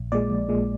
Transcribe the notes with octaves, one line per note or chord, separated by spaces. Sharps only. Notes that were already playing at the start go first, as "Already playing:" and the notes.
Already playing: A#1
A#2 G#3 D5
A#1
A#2 G#3